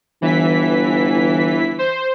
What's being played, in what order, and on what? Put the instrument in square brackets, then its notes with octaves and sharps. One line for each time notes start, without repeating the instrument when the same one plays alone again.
[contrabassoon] G1 [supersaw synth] E3 B6
[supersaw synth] C5